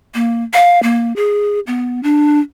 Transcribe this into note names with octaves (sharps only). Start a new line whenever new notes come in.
A#3
F5
A#3
G#4
B3
D4